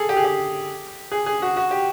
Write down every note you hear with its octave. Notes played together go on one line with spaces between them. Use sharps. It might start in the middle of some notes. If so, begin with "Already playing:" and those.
Already playing: G#4 A4
G4
G#4
G4
G#4
G#4
F#4
F#4
G4